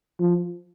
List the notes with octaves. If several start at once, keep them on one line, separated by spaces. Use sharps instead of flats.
F3